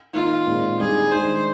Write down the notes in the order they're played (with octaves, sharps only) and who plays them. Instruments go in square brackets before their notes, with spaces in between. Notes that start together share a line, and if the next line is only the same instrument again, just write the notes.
[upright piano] D#3 A#3 D#4 [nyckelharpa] F4
[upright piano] A#2 G#3 C4 D#4
[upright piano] D#3 G3 D4 [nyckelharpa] G#4
[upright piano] D#3 G#3 D4 [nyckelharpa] C5